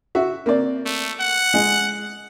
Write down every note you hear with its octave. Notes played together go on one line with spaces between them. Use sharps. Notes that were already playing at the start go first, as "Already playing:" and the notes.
F#4 E5
A#3 C4 D5
A3
F#5
G#3